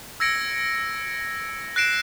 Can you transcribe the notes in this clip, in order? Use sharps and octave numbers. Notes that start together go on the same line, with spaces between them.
E6 G#6 A#6 C#7 D7
F#6 A#6 C7 D7 E7